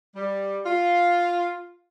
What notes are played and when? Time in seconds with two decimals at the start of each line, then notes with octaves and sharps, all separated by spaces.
0.14 G3
0.65 F4